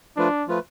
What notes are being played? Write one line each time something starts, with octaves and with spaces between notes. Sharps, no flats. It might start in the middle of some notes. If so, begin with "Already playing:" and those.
F3 A3 D4 F4 B4
F3 A3 F4 B4